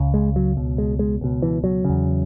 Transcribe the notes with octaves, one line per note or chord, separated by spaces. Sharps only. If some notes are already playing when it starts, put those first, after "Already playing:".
Already playing: C#2 C#3
G#3
F#3
C#2 B2
G#3
G#3
C#2 B2
E3
F#3
E2 C#3